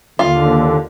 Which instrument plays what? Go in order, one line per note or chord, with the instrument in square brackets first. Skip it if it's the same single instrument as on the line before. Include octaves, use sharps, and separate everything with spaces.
[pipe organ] D#2 D3 [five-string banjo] F4